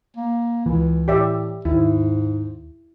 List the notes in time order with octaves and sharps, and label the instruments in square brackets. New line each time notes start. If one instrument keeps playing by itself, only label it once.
[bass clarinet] A#3
[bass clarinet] C#2 [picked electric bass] E3
[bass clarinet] A2 [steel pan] G4 D5 E5
[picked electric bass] D#2 [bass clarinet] G#2 [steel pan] E4